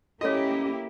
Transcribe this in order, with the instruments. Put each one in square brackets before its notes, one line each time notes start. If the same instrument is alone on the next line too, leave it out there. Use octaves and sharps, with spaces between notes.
[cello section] A#3 E4 G4 [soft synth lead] C#4 [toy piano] F#4 A4 C#5 [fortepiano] D#5